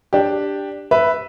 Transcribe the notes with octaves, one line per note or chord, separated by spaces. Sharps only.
D4 G4
B4 E5